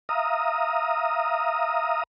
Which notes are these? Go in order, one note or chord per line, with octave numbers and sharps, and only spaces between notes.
E5 F5 A#5 D#6